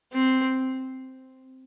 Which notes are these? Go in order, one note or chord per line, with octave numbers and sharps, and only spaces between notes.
C4